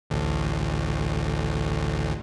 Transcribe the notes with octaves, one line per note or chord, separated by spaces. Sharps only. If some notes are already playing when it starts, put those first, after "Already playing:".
A1 D2